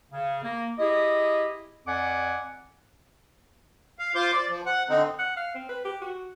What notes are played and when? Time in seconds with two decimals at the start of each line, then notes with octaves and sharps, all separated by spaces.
0.11 C#3
0.43 A#3
0.78 E4 G4 G#4 D#5
1.86 F2 D5 F#5 G#5 D6
3.99 F5
4.15 F4 C5 C6 D6
4.33 D5
4.49 F3
4.66 F#5
4.89 D3 C4 D#4
5.19 F#5
5.37 F5
5.55 C4
5.69 B4
5.85 G4
6.01 F#4